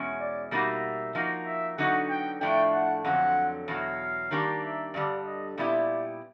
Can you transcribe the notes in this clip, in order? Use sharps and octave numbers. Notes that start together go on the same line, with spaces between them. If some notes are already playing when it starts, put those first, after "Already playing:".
Already playing: E2 B2 G#3 C#4
D5
B2 G3 A#3 D#4 F#4 E5
F3 A#3 D#4 F#4
E5
D3 F#3 B3 D#4 F#4 F#5
G5
A2 F3 A3 D4 G5
F#5
F2 D3 F#3 A3 C4 F#5
E2 B2 F#3 F5
D#3 G3 A#3 D4 G4
E5
G2 D3 G3 D5
D#5
A#2 G3 B3 E4 G4 D5